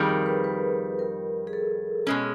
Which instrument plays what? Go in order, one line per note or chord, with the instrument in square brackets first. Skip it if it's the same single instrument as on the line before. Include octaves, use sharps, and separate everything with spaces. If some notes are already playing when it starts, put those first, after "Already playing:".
Already playing: [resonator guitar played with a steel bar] F2 D#3 G3 [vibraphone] G#4
[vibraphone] A#4
B4
B4
A#4
G#4
A4
[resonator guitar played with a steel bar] B2 G#3 C#4 [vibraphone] G#4